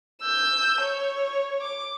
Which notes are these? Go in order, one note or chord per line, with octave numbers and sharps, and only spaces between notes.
E6 G6
C#5
D6